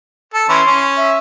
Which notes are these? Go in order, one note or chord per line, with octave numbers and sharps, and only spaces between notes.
A4
E3 C#4 E4 C6
C#4
E5